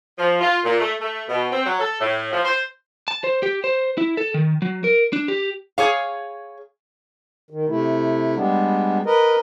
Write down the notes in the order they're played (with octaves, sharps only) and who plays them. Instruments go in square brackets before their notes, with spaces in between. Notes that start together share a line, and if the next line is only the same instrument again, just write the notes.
[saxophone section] F3
F4
A#2
A3
A3
B2
C4
F#3
A4
A2
F3
C5
[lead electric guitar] A5
C5
G4
C5
E4
A4
D#3
F#3
A#4
D4
G4
[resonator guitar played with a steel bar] G#4 C#5 F5
[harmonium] D#3
C3 A3 E4
G3 G#3 B3 D4
A#4 B4 D#5